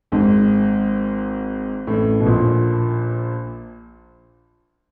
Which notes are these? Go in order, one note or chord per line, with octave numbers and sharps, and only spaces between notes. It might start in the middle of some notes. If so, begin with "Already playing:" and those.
G#1 G#2
A1 A2
B2
A#1 A#2